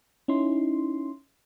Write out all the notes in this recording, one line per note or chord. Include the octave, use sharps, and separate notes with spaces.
C#4 D#4 E4 C6